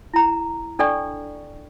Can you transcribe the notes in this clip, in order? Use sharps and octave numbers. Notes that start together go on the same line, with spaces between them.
E4 A#5
D4 A4 D5 G5 C#6